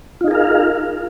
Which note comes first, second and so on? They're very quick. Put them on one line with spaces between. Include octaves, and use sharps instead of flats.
F4 D#4 G#4 A#4 F5